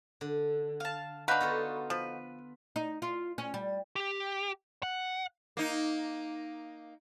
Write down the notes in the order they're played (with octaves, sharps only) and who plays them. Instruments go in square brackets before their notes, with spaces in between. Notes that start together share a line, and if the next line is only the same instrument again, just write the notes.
[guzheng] D3
[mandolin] F5 A5
[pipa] D4 B4 [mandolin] D#4 F#4 F5
[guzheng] B3 F4 A4
[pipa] F3 [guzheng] B4
[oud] D#4
F4
C#4
G3
[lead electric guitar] G4
F#5
[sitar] A#3 D#4